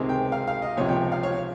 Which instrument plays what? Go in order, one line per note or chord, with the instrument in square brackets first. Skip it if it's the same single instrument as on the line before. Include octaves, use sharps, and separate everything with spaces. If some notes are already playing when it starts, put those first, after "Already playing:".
Already playing: [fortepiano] C#2 C3 D#3 G#3 C4
G5
F5
F5
D#5
C#2 C3 F3 C#5
G5
F5
C#5